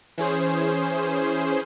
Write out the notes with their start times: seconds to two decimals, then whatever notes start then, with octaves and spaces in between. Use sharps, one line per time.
0.18 E3 C#4 G#4 C5